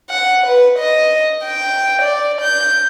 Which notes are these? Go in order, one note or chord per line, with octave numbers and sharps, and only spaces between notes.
F#5
B4
D#5
G5
D5
G6